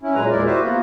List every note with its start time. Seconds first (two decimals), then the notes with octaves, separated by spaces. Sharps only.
0.02 C#4 E4
0.14 A#2 F#3 G#3 B4 A#5
0.30 E2 A#2 G#3 E4 A#4 D5
0.46 F#4 G4 B4 C5 E5
0.62 A#3 B3 F4 F#4